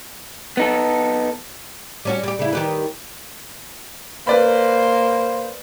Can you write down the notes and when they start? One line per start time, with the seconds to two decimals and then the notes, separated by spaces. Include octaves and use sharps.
0.57 B3 D#4 A4
2.05 G3 C#4 F#4
2.23 G3 G4
2.39 C#3 E4
2.53 D#3 G4 B4
4.27 A#3 B4 C5 D5 B5